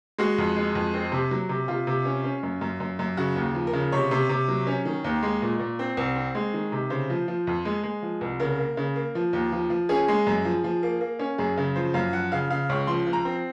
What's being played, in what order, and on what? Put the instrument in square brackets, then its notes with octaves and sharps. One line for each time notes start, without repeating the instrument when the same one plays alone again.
[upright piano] G#3 F#4
F2
G#3
F2
C4
C3
F#3
C3
C3 F4
C3
C#4
C#4
F#2
F#2
F#2
F#2
C#3 F#4
D#2
F3
A#4
C#3
C3 C#5
C3
C3
F#3
C#4
D#3
D#2
G#3
A#2
A#2
C4
C2
C4
G#3
D#3
C3
C#3 C5
F3
F3
F2
G#3
G#3
F3
C2
C#3 A#4
A#3
C#3
A#3
F3
D#2
F3
F3
C#4 G#4
G#3
F#2
F3
F3
A#3
A#3
C#4
F#2 G#4
C#3
F3 C5
F#2 F5
F3 F#5
C#3 F5
C#3 F5
C#2 C#5
F3 C6
F3
A#5
C4